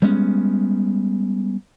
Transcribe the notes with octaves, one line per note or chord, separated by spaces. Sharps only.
G3 G#3 B3 C#4